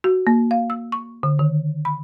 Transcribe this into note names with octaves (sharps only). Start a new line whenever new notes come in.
F#4
A#3
F5
E6
C#6
D3
D#3
B5